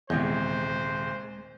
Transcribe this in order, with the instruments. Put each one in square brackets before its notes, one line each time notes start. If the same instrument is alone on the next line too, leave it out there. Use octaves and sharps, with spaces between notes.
[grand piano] D#1 C3 G6 [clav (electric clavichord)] E2 [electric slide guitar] G#3 [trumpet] C5